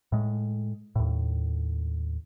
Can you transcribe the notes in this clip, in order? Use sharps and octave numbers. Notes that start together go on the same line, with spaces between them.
A2 G#3
D#2 A2